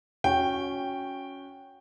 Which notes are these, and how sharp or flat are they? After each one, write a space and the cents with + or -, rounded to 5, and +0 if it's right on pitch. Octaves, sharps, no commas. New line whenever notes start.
C#4 +5 F#4 -15 G5 +0